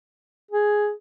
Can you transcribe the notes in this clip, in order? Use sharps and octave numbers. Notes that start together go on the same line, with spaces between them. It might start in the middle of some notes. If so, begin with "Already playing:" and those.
G#4